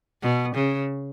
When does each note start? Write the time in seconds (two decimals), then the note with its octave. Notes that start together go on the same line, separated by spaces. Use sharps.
0.23 B2
0.55 C#3